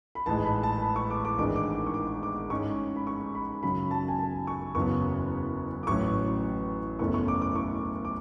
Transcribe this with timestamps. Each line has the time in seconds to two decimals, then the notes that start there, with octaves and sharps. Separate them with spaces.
0.15 B5
0.26 A1 G#2 G#3 A5
0.45 B5
0.63 A5
0.82 B5
0.96 C#6
1.10 D6
1.25 D6
1.38 G#1 G#2 E3 G#3 D4 D6
1.56 D6
1.86 C#6
1.94 D6
2.23 D6
2.50 G#2 G#3 C#4 C#6
2.96 B5
3.07 C#6
3.35 B5
3.63 F#2 C#3 F#3 B5
3.91 A5
4.08 G#5
4.19 A5
4.47 C#6
4.75 F#1 E2 C#3 F#3 B3 C#6
5.83 D6
5.87 A1 A2 F#3 C#4 C#6
6.99 F#1 E2 B2 A3 C#4 C#6
7.14 C#6
7.28 D6
7.42 D6
7.55 C#6
8.05 D6